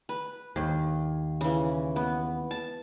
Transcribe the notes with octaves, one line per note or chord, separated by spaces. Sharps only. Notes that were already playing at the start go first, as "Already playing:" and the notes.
B4
D#2
C#3 E3
B3
A5